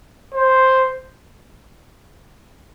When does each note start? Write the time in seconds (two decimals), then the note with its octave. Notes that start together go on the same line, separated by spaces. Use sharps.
0.34 C5